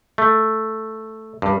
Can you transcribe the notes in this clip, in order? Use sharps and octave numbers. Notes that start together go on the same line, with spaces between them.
A3
G2